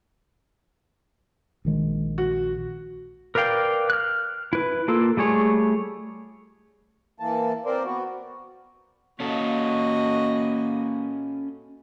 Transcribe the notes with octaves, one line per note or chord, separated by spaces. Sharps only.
A#1 D#3 G#3
F#4
A#4 B4 D5 F5 G5
F6 F#6
E4 B4
A#3 F4 A4
G3 A3 G#4 C#5
E3 A#3 A5
C4 A#4 C5 D5
B3 F#4
A#3 C#4 F#4 A4 D#5